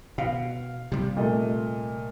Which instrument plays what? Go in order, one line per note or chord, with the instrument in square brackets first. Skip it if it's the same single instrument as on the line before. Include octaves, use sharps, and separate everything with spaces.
[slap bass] B2 [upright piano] F5
[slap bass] C3 G3
[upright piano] A#2 A3 D#5